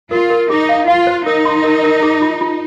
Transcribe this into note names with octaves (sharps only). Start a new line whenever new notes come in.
F4 A#4
A#4
D#4 G#4
F5
F4 F5
C5
D#4 A#4
C6
A#4
A#4
G#4
F4
F4